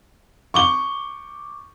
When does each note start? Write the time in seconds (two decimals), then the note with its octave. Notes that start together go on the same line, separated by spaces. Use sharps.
0.54 C#6 D6 G7